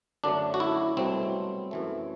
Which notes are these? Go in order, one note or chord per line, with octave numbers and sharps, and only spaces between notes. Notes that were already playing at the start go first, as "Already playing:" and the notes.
F#2 D3 F#3 A3 D4
F#4
E4
C2 B2 F#3 A3 C4
F#2 E3 A3